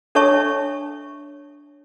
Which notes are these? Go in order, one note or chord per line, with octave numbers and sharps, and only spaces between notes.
D4 A4 C#5 E5 A5 C#6